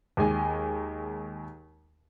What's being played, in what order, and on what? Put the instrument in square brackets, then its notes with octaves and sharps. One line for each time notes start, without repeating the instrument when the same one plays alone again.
[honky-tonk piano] D#2 G#3 G#5